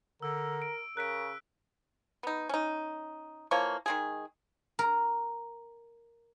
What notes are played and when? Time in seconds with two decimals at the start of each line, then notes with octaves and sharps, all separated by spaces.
0.22 D3 A#4 E6
0.62 D7
0.97 C#3 A#4 F#6 B6 D7
2.23 B3 D#4
2.49 C#4 D#4
3.51 E3 F3 A#3 C#5
3.86 D#3 G#3 G#4
4.79 A#4